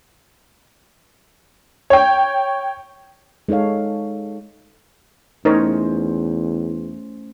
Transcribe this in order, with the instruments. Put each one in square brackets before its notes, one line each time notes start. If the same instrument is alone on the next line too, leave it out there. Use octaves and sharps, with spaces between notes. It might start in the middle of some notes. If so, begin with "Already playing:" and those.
[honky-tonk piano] C#5 G5
[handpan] G#3 D#4 A4 C#5 F5
[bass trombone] E2 [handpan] A3 C#4 C5 [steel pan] D#4 A#4 C#5